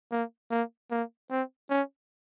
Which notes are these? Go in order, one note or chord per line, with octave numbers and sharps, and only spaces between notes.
A#3
A#3
A#3
C4
C#4